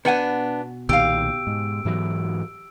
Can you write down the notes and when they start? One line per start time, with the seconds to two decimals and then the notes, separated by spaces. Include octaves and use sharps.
0.05 B2 B3 D4 F#5 G#5
0.89 B1 A#2 D#3 G4 F5 E6 D7
1.47 G#2
1.85 G#2 E3 F#3